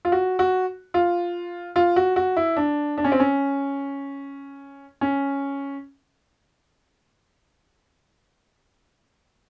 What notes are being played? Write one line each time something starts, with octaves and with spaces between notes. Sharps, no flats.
F4
F#4
F#4
F4
F4
F#4
F#4
E4
D4
D4
C#4
C4
C#4
C#4